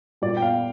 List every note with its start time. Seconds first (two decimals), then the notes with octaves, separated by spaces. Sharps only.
0.22 A#2 G3 D5
0.37 G5
0.42 F5